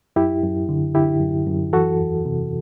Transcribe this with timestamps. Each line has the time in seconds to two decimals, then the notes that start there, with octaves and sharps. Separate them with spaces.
0.16 F#2 E4 G4
0.43 F#2
0.69 D3
0.95 D3 E4 G4
1.20 F#2
1.47 F#2
1.73 E3 F#4 A4
1.99 E2
2.25 C3